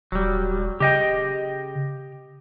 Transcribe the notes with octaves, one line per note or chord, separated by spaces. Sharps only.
D#1 F#3 G3
C#3 G4 D#5 G5